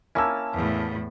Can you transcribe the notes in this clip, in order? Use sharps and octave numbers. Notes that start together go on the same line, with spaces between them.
A#3 C#4 E4 G#5 A5 E6 F6
E2 A2